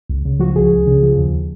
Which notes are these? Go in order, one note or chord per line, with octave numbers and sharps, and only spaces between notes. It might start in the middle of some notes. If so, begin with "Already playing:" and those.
C#2
C#3
F3 F#4
C#2 G#4
C#2
C#3
F3
D#2